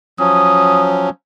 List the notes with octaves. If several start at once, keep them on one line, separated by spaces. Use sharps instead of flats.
F3 F#3 C#4 D#6